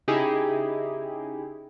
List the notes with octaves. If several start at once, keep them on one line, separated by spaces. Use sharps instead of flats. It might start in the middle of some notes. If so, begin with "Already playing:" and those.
C#3 D#4 E4 G4 G#4